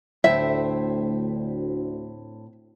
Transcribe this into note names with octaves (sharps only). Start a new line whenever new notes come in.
D2 A2 C4 C5 E5